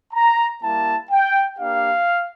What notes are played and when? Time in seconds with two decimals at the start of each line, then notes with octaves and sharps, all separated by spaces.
0.13 A#5
0.62 G3 A#3 E4 A5
1.10 G5
1.58 A#3 D4 G4 F5